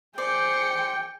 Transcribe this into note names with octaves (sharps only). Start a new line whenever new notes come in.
G#4 C5 D5 G5 C#7